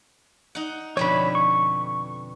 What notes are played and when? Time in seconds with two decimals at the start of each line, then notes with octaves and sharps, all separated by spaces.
0.55 D#4 F#5
0.97 F2 B2 D3 C#5 B5
1.35 C#6